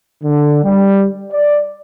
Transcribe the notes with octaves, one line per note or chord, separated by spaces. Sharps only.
D3
G3
D5